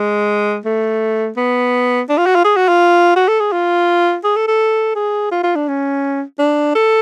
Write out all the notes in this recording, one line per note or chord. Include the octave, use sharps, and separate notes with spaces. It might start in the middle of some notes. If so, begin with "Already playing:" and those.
Already playing: G#3
A3
B3
D4
F4
F#4
F4
G#4
F#4
F4
F#4
A4
G#4
F4
G#4
A4
A4
G#4
F4
F4
D4
C#4
D4
A4